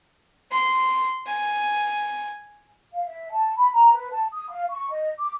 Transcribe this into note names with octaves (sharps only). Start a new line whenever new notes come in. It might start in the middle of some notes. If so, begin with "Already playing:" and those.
C6
G#5
F5
E5
A5
B5
A#5
B4
A5
D#6
F5
C#6
D#5
D6